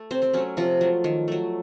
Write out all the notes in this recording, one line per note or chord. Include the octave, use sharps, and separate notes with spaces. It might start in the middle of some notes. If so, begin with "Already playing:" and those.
Already playing: A3
C3 C4 C5
C4 C5
F#3 A3 C#4
C3 F3 F4
F#3 A3
D#3
F#3 A3